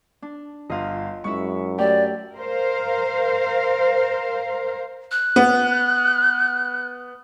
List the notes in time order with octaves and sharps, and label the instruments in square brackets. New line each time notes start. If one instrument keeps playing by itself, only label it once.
[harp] D4
[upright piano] G1 F5 [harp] F4 D#5
[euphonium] F#2 [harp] G#3 E4 E5 [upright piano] C#6
[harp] A3 E5 [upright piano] G4 [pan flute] D5
[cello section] A#4 C5 F5
[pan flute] F#6
[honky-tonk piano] B3